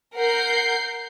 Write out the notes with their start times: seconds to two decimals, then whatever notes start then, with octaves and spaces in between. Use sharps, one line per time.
0.16 A#4 F#5 G6 C7